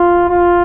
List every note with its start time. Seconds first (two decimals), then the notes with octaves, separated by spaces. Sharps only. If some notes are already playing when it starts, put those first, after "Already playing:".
Already playing: F4
0.29 F4